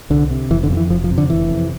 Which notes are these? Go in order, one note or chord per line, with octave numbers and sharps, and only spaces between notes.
C2 D3
C3
F1 E3
D3
F2 C3
E3
F1 F3
F3
F2 C3
D3
F1 E3
F2
C3